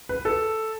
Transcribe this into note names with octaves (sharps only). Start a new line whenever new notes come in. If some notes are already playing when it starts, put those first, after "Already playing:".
B4
A4